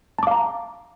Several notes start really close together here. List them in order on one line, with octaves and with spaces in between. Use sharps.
A5 D6 F5 A#5